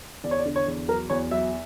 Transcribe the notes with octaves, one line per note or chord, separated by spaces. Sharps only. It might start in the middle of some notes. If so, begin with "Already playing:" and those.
E2 D5
C#5
D5
D3
C#5
E2
F#3 A#4
E2 C#5
F#3 E5